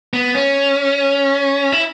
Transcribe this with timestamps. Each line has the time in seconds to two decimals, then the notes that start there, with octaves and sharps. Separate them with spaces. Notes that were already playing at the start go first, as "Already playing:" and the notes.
0.14 B3
0.35 C#4
1.72 E4